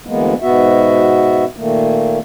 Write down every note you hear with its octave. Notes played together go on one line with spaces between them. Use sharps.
D2 E3 G#3 A#3 B3
G#2 B2 B3 F#4 E5
A#2 D#3 A3 A#3